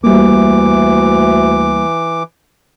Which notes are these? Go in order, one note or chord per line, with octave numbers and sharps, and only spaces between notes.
D2 E3 G3 A#3 D6